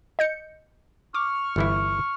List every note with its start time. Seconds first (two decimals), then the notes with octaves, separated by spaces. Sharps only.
0.19 D#5 G6 C#7
1.14 C#6 D6 F6
1.56 G1 E3 E4